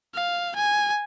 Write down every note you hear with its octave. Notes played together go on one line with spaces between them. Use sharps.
F5
G#5